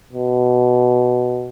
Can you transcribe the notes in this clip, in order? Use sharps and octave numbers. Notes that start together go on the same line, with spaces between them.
B2